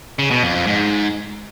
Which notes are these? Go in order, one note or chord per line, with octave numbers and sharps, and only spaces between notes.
C#3
B2
F2
F2
G#2